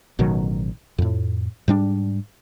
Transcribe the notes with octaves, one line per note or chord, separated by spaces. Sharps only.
A1 B2 D#3 F#3
F2 A2
G#2 G3 D4